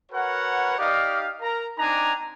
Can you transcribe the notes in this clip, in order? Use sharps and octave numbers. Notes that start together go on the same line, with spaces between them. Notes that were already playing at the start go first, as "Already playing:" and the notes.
F#4 A#4 B4 C#5 F#5
D#4 G4 D5 D#5 F5
A#4 A#5
C4 D4 D#4 G#5 A#5 D6